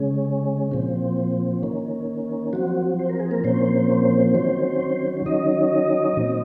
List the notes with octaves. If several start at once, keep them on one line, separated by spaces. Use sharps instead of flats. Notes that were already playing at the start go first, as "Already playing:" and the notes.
Already playing: C#3 G#3 C#4
A#2 F3 C4
D#3 A#3 C#4
F3 F#3 C4 F#4
C5
A#4
G#4
A#3 A#4
A#2 F3 A#3 C4 C#4 C5
D#3 F#3 C#4
D#3 F#3 C#4 D#4 D#5
A#2 F#3 C4